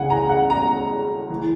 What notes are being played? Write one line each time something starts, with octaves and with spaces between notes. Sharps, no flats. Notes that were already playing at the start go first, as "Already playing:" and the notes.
Already playing: C#2 C#3 E3 F#5 G#5
A#5
F#5
A#5
E3